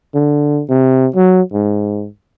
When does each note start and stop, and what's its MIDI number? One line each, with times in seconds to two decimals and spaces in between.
0.14 0.62 50
0.69 1.07 48
1.16 1.41 54
1.53 2.07 44